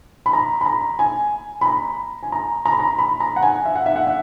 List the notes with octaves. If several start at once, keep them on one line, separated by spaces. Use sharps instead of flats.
B5
A#5
B5
A#5
G#5
B5
A#5
G#5
A#5
A#5
B5
A#5
B5
A#5
F#5
G#5
E5
F#5
E5
F#5
E5